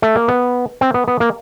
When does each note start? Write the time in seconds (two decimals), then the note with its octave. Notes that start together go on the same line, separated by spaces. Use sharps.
0.02 A3
0.15 A#3
0.28 B3
0.81 C4
0.94 B3
1.08 B3
1.20 A#3